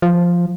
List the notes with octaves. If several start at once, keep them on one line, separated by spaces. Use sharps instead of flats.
F3